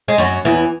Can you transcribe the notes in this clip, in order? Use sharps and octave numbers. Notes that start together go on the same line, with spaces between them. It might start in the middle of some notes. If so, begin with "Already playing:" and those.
G#3
F#2 F#3
E2 E3